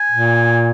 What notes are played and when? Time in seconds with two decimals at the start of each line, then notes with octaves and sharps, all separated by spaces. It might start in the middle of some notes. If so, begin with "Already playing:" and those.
Already playing: G#5
0.11 A#2